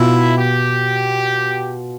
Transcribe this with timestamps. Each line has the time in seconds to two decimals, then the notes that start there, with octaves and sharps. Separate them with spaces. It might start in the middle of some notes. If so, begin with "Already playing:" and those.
Already playing: B2 B3 E4 F4
0.37 G4